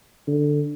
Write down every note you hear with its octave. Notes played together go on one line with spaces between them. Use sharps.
D3